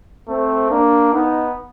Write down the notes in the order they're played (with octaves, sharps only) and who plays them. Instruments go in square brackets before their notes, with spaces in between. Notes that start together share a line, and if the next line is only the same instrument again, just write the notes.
[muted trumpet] A3 [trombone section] C4
[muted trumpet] A#3 [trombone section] D4
[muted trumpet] B3 [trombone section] D#4